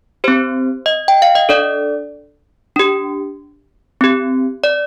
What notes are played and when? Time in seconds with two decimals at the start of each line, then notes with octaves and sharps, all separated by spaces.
0.24 C4 G4 C5
0.86 D#5
1.08 G5
1.22 F5
1.35 D#5
1.49 D4 A4 D5
2.76 D4 G4
4.01 C4 G4
4.64 D5